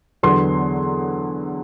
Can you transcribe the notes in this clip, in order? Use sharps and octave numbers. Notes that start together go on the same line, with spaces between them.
E2 D3 F#3 B3 C6